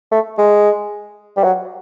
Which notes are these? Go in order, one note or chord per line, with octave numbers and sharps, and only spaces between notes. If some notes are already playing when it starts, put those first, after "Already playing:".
A3
G#3
G3
F#3